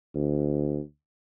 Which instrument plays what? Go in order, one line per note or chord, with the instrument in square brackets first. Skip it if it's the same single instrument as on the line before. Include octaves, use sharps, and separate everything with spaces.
[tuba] D2